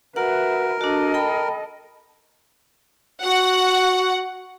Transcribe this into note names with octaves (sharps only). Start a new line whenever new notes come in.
F#4 A#4 B4 E5 F#5
D4 F#4 A4 D#5
G5 B5
F#4 F#5